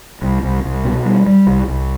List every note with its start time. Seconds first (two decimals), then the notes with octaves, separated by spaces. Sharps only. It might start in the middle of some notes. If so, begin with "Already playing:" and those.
0.22 C2
0.43 C2
0.64 C2
0.85 B2
1.05 G3
1.26 G3
1.47 C2
1.68 C2